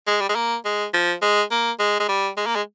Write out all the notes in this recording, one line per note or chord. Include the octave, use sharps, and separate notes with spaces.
G#3
G3
G#3
A#3
G#3
F3
G#3
A#3
G#3
G#3
G3
G#3
A#3
G#3